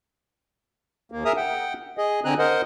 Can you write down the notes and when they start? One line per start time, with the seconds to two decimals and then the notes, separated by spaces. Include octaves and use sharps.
1.12 D#2 A#3
1.25 G#4 A#4 E5 A#5 D#6
1.37 F#5 G5
1.98 G#4 D#5
2.25 D3 C4 G#5 A#5 F#6
2.39 A#4 C5 D#5 F#5